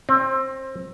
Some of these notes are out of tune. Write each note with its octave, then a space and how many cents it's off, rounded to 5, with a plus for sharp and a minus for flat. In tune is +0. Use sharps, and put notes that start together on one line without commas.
C4 +25